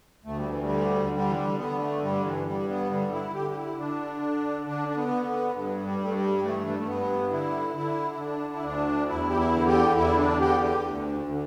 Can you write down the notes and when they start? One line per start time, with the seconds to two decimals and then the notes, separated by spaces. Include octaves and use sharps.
0.25 D2 A3
0.37 G3
0.50 E3
0.62 G3
0.69 D3
1.14 D3 G3
1.28 E3
1.36 G3
1.58 D3 B3
1.79 A3
2.02 G2 G3
2.24 E3
2.46 G2 G3
2.68 B3
2.90 D3 G3
3.12 E4
3.34 D3 G4
3.50 G4
3.56 E4
3.78 D3 D4
4.22 D3
4.66 D3 D4
4.89 D4
4.97 B3
5.11 D3
5.26 B3
5.55 G2
5.84 G3
5.99 G2 A3
6.14 G3
6.43 E3 A3
6.61 E3
6.70 G3
6.79 A3
6.87 G2 B3
7.31 D3 E4
7.76 D3 E4
8.11 E4
8.19 D3 D4
8.53 E4
8.64 D2 D4
9.08 E2 E4
9.30 G4
9.37 E4
9.53 D3
9.67 G4
9.96 E2 E4
10.18 D4
10.41 D3 G4
10.63 G4
10.84 D2
11.29 D3